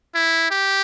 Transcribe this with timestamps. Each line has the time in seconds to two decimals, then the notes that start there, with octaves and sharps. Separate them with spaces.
0.15 E4
0.51 G4